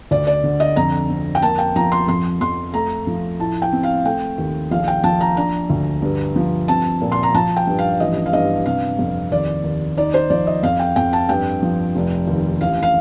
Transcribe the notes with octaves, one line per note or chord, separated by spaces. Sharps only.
D2 D5
D5
D3
D#5
F2 A#5
C4
G5
A#3 A5
G5
F3 A#5
C6
F2 C6
F2 C6
A3 A#5
F3
A2 A5
G5
C4
F5
A3 G5
D#2
A#1 F5
G5
F3 A5
A#5
D4 A#5
D2
G2
F3
C4 A5
A#2
C6
A#5
F3 A5
G5
G2
F5
A1 D#5
F5
G2 D#5
C3 F5
F2
D#2 D5
D#2
D#4 D5
C5
F3 D5
D#5
F2 F5
G5
F2 G5
A5
G2 G5
F3
F1
D#2
A1 F5
F5